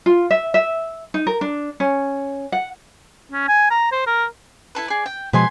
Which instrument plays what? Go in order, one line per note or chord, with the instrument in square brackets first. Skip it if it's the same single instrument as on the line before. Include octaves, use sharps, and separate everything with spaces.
[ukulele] F4
E5
E5
D#4
A#4
D4
C#4
F#5
[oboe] C#4
G#5
A#5
C5
A#4
[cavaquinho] E4 A4 B4
G#4 D5
G5
[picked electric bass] B2 F3 G#3 [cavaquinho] B4 G#5 C6